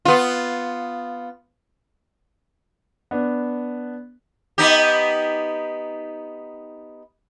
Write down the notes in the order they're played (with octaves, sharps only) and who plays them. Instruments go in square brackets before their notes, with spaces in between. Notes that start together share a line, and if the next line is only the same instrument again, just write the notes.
[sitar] B3 F4
[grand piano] B3 D4
[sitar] B3 D#4 G4